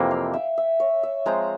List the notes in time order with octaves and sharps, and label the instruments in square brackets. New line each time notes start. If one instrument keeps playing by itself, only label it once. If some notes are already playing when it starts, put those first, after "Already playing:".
Already playing: [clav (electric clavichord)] F2 C3 E3 A#3 [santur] G5
[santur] F5
E5
E5
C#5
E5
[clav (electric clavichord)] F3 G#3 C4 F4 C5 [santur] A#5